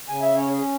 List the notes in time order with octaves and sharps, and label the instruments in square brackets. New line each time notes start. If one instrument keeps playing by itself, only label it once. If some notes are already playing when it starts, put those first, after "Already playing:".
[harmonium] C#3 G#5
E5
C#4 C#5
G#4